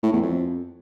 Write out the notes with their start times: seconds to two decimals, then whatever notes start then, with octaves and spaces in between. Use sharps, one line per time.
0.03 A2
0.13 E2
0.22 F2